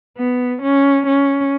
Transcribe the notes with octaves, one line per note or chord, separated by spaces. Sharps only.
B3
C#4
C#4